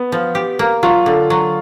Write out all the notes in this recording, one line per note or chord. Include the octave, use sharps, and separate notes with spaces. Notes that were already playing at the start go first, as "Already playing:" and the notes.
Already playing: B3
F3
G4
A#3
F#3 F4
D3
F#3